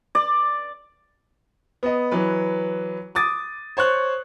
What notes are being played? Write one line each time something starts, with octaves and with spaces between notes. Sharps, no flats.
D5
B3 D#5
E3 F#3 B4
D6 D#6 A6
C5 C#5 C#6 F#6